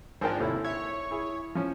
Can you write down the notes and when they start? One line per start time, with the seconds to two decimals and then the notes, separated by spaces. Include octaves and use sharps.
0.21 G#1 F3 D4 A#4 G5
0.40 D#2 C3 E4 A4 C#5
0.64 C#5 E5
1.11 E4 G#4
1.55 F3 C#4